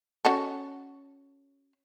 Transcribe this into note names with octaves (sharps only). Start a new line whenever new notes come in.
C#4 F#4 A4